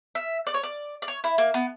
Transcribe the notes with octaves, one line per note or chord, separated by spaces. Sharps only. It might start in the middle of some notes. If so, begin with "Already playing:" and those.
E5
D5
C#5
D5
D5
C#5
E4
A#3
B3